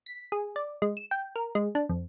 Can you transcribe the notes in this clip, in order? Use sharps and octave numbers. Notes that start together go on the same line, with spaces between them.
B6
G#4
D5
G#3
E7
G5
A#4
G#3
D4
F2